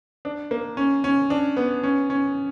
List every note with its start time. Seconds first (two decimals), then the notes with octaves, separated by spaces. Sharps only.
0.25 D4
0.51 A#3
0.77 C#4
1.04 C#4
1.30 D4
1.56 B3
1.83 C#4
2.10 C#4